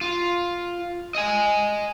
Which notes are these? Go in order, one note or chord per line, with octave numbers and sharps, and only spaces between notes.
F4
D#5 G#5